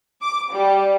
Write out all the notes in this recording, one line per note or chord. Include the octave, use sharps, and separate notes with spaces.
D6
G3